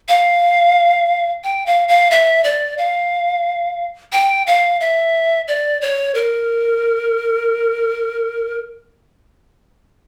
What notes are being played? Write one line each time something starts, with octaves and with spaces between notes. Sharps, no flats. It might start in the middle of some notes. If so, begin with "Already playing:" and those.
F5
G5
F5
F5
E5
D5
F5
G5
F5
E5
D5
C#5
A#4